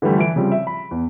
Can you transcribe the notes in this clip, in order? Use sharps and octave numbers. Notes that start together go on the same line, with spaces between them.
D3 E3 F3 G3 A3
E3 D7
C#3 F3 G3 C4
E5
B5
E2